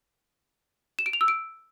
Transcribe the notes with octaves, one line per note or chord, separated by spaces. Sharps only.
E7
D7
F7
E6
D7